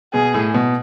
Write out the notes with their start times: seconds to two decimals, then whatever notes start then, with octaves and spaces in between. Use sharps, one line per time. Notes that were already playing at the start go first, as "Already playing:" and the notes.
0.13 B2 G#4
0.34 A2
0.54 B2